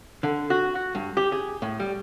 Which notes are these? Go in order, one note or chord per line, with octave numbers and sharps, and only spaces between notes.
D3
F#4
F#4
G2
G4
G#4
A2
G3